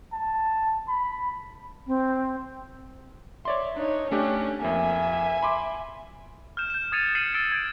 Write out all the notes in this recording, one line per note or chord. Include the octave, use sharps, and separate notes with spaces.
A5
B5
C4
C#5 D5 E5 C6
D4 D#4 C#5
A3 C#4 D4 G4
F2 A#3 E5 G#5
B5 C6 D6
F6 G6 E7
G6 E7
D#6 G#6 A6 C#7 D#7 F7
F6 C7 C#7 D#7 F#7
E6 F6 A6 D7
G#6 D7